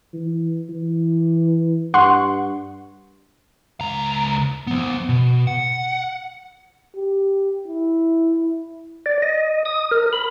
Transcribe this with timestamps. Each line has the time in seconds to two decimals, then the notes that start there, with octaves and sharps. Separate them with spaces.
0.13 E3
0.69 E3
1.94 G2 F#5 C6 C#6
3.81 C#2 A#5
4.67 F3 B3
5.09 B2
5.47 F#5
6.96 G4
7.67 E4
9.06 D5
9.22 D#5
9.65 D#6
9.91 A#4
10.13 B5